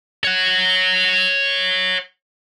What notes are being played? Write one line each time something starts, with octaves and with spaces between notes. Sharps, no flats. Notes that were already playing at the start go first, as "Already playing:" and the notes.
C#5 F#5